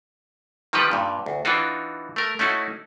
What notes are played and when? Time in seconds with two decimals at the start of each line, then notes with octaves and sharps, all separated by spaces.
0.73 D#3 F3 G3 D#4 G4 B4
0.91 G2 A#2
1.26 D2
1.45 E3 D4 D#4 F4 F#4
2.16 A3 A#4
2.39 A3 C#4 D#4 E4 F#4